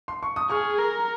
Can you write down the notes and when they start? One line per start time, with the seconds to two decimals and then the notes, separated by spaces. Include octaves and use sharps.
0.08 C6
0.23 C#6
0.36 D#6
0.50 G#4 C#6 F6
0.79 A#4